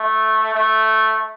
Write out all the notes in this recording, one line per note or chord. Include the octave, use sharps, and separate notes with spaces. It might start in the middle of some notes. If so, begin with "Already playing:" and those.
Already playing: A3
A3